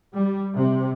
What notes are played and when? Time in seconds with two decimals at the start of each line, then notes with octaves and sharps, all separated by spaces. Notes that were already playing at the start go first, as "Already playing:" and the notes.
0.15 G3
0.55 C3